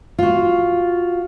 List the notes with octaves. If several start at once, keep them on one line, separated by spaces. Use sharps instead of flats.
F4 F#4